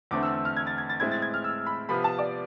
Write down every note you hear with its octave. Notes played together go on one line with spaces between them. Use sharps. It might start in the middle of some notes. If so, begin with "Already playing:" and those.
E2 D3 A3 C4 D6
E6
E6
F6
G#6
A6
G#6
A6
A2 G#3 C4 E4 G#6
A6
G#6
F6
E6
B5
C3 F3 B3 B5
A5
D5